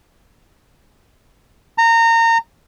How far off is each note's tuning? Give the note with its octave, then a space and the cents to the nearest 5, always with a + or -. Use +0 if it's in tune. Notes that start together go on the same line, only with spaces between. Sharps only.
A#5 -25